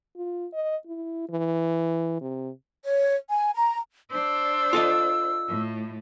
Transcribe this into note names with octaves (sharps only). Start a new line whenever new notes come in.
F4
D#5
E4
E3
C3
C#5
G#5
A#5
D4 C5 E6
F4 A4 D#5
A2